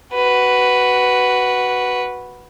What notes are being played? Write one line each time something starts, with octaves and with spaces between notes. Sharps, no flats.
F#4 B4